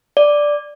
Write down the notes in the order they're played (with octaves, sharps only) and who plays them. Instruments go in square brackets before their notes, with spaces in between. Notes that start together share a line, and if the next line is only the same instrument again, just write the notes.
[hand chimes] D5